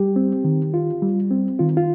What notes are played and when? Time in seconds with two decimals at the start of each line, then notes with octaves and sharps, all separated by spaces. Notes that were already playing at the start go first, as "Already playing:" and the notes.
Already playing: G3 G4
0.16 C4
0.44 D#3
0.74 F4
1.02 G3
1.31 C4
1.59 D#3 F4
1.77 F4